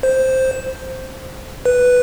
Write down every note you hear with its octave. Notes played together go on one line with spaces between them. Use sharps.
C5
B4